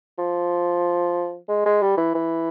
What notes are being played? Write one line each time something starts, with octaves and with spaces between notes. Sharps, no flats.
F3
G#3
G#3
G3
E3
E3